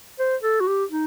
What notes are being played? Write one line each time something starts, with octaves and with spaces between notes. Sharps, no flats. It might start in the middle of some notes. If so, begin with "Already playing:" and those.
C5
A4
F#4
G4
D#4